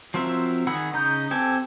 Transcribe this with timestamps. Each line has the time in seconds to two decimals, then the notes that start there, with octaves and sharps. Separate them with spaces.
0.14 F3 F#3 C4 A#4 E5
0.67 D#3 G#4 F#5 B5 E6
0.93 C#3 D#4 A#5 G6
1.31 C4 G4 A4 G#5